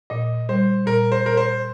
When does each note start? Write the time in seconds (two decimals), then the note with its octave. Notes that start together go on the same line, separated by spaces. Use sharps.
0.10 A#2 D#5
0.49 G3 C5
0.87 A#2 A#4
1.12 C5
1.25 A#2 A#4
1.37 C5